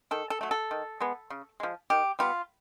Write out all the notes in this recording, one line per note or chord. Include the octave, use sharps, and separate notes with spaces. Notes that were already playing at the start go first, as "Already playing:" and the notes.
D#3 A4
A4
F#3 A3
A4
D#3
G#3 B3
C#3
F3 G#3
D#3 G4
G3 B3 F4